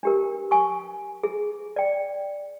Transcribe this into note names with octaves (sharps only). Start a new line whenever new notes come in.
D4 G4 A#4
G#5 C#6
G#4
D5 G5